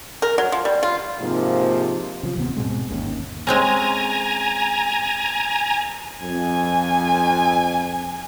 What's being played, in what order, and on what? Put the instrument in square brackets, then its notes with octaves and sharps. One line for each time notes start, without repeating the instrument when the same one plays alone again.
[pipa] A#4
F#3
F3
G3
F4
[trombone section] G#2 C3 F3 A#3
[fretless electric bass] C#3 F3
D#1 D#2 C3 B3
G#2 B2 G#3 C4
G1 D#2 C#4
[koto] G#3 C4 C#4 [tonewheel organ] G#5 A#5
[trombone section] F2 [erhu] G#5